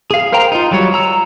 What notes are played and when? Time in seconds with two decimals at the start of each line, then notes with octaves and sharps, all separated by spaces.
0.11 G#4 F5
0.32 A#4 C5 F5 G5 A#5
0.52 D#4 F4
0.71 F#3 G3 C#5
0.94 A#5 E6